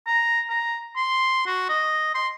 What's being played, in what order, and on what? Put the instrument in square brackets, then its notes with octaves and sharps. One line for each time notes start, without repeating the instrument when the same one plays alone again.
[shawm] A#5
A#5
C6
F#4
D#5
C6